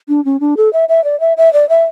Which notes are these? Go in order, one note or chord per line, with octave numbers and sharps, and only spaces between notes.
D4
C#4
D4
A4
E5
E5
D5
E5
E5
D5
E5